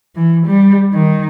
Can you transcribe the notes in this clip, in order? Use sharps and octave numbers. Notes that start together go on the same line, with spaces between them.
E3
G3
D#3